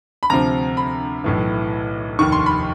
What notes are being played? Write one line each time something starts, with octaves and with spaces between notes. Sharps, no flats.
B5
D2 C3 F3 A#5
B5
B1 A2 E3
F1 D#2 D#3 C#6
C6
B5